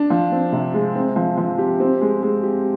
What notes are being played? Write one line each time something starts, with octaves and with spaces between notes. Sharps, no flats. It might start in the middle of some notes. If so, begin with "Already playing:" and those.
Already playing: D4
F3
C4
C3
G#3
C4
F3
F3
G4
C4
G#3
G#3
G4